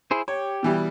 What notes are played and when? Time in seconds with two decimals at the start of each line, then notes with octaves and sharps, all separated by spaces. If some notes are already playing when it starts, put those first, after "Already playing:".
0.11 E4 G#4 C5
0.28 G4 C#5
0.63 B2 E3 G3